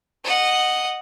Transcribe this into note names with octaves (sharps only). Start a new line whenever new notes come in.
D#5 F#5